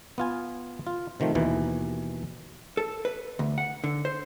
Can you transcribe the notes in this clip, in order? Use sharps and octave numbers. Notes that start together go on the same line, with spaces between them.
B3 F4 G#5
F4
C3 D#3 F3 A3
D#2 B2 E3
A4
B4
D2
F#5
D3
C5